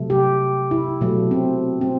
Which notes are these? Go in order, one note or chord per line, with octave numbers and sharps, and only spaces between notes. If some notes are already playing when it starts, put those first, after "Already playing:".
Already playing: C3 F#3 A3
G4
E4
B2 F#3 A3
C4
C4